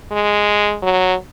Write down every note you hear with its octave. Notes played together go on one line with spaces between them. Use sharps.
G#3
F#3